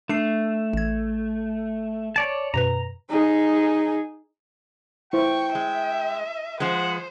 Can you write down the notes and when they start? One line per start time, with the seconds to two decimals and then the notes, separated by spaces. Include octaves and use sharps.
0.09 A3 D4 C7
0.73 A1 G#6
2.16 C#5 D5 A5
2.54 F#2 B2 B4 A#5
3.10 D#4 G#4
5.13 E4 C5 G5 C#6
5.55 G#3 E5
6.60 F3 G#3 C5 F#5